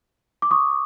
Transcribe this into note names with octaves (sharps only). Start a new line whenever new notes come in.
D6
C#6 D#6